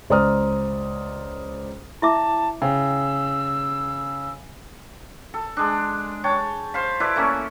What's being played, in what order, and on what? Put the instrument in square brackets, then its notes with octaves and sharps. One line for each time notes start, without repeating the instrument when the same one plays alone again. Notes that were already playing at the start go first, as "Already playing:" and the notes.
[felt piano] C#2 C5 D5 A#5 D#6 F6
[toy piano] E4 E5 D6 [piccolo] A5
[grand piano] C#3 [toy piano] G5 [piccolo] E6
[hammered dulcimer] A4
G#3 D4
C#5 G5 A5
C5 F5 B5
E4 A4 B4 D5
A3 A#3 C#4